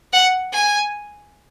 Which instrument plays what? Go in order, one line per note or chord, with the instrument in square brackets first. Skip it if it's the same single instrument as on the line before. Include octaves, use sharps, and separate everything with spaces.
[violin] F#5
G#5